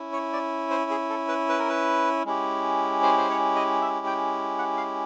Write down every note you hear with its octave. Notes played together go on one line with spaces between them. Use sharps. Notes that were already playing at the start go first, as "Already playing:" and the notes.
Already playing: C#4 E4
C#5
D5
C5
G#4
A4
B4
B4
A#4
B4
G#3 C#4 E4 G4
C5
C5
C#5
D#5
E5
G5
F#5
F5